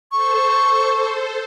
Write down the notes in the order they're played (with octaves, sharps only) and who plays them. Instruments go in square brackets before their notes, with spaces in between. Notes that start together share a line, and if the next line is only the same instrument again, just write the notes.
[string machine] A4 C5 [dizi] C#6